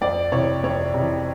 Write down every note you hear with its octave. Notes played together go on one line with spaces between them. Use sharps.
F2 D5
C3 E3 C#5
F2 C#5
C3 E3